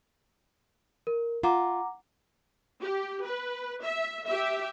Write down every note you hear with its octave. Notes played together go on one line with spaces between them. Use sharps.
A#4
F4 F#5 A#5 D6
G4
B4
E5
G4 E5